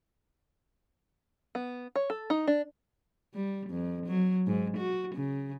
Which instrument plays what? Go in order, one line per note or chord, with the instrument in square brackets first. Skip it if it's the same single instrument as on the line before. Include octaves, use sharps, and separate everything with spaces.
[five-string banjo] B3
C#5
A4
D#4
D4
[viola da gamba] G3
F2
F#3
G#2
F#4
C#3